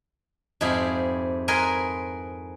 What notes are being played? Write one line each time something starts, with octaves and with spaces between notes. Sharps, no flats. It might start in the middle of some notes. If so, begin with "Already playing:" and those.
F2 G#2 E4 G4 G#4 F5
G#4 A#4 B4 G#5 C6